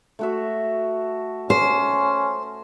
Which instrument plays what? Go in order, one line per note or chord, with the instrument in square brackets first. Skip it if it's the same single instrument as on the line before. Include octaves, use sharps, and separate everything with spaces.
[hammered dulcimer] A3 F#4 E5
[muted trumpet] C#4 [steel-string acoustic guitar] C5